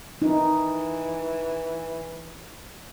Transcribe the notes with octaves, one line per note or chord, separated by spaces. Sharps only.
E3 D#4